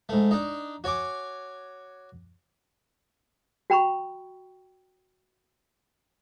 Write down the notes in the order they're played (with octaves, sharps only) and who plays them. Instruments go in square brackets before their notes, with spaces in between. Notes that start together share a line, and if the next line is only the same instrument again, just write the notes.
[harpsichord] G#2 A3
D4 D#4
F#4 C#5 G#5 D6
[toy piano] F#4 G5 A#5 B5 C#6